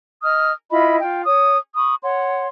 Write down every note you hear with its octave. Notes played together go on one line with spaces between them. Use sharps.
D#5 D#6 F6
E4 F4 D#5 B5
F4 G5
C#5 D#6
B5 C#6 D#6
C#5 F#5 C6